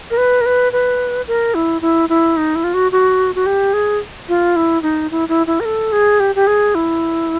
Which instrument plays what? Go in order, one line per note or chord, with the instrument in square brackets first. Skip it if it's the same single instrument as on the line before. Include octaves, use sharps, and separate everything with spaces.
[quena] A#4
B4
A#4
B4
B4
A#4
E4
E4
E4
D#4
E4
F4
F#4
F#4
F#4
G4
G#4
F4
E4
D#4
E4
E4
E4
A#4
A4
G#4
G4
G4
G#4
E4